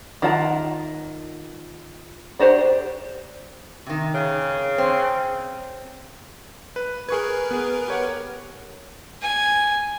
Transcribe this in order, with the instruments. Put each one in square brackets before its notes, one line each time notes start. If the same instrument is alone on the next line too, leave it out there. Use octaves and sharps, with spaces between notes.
[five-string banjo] D#3 F4 F#5 A5
D4 F#4 G4 C5
[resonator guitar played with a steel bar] C3 D#3
[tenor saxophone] C#3
[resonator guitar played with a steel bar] C4
[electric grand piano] B4
[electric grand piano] G#4 C#6 G#6 [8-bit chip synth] A#4 B4
[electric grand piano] B3 G#4
G4 C#5 F#5
[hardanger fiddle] G#5